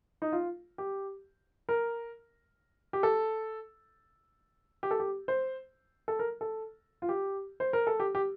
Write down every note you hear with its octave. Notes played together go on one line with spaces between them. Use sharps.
D#4
F4
G4
A#4
G4
A4
G4
A4
G4
C5
A4
A#4
A4
F4
G4
C5
A#4
A4
G4
G4